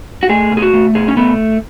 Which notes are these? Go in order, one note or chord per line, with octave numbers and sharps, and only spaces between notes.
F#4
A3 G#4
B2
G#4
F#4
A3
B2 G#4
C#4
A3 B3